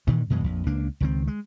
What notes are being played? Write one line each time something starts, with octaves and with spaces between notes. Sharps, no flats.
G2 A#2 D#3 E3
F#2 B2 E3 G#3
A#1 F2
C#2 A#3 D4
C#2 D#3 C4
G#3